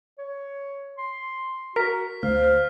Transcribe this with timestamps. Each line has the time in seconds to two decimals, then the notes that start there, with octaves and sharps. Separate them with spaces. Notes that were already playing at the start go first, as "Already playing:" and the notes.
0.19 C#5
0.98 C6
1.76 F#4 A#4 B6
2.23 D2 C5 F5 F6
2.44 F6